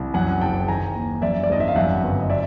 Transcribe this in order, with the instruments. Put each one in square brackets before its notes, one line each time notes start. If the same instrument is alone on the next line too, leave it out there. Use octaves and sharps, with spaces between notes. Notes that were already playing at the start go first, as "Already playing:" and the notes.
Already playing: [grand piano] C2
F#2 F#5 G#5
F#1 G5 A5
D#3 G#5 A#5
D#2
F#2 D5 E5
D5
G#1 D#5
E5
F5
F#2 E5 F#5
G1
D#5
D5 E5